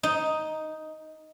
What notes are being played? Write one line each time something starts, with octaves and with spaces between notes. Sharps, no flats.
D#4